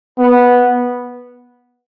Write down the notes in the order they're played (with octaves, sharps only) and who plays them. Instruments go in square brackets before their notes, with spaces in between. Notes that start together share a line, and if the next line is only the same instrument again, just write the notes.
[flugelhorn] B3